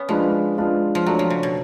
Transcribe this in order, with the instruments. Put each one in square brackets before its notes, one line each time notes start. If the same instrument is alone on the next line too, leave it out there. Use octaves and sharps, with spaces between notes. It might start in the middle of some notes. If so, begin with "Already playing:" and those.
Already playing: [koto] B3 C#4
[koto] F3 [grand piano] G#3 D4 F4 B4
[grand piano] G#3 D4 F4 B4
[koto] F3
[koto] F#3 [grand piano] A3 D4 F#4
[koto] F3
C#3
B2